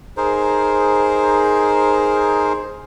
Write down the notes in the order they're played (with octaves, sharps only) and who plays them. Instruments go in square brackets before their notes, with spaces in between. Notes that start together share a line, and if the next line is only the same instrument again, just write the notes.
[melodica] D#4 G#4 A#4 C5